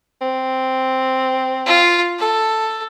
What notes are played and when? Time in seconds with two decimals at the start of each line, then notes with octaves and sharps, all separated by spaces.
0.22 C4
1.66 F4
2.19 A4